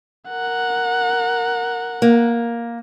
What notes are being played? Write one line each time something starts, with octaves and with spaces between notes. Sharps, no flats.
A#4 F#5
A#3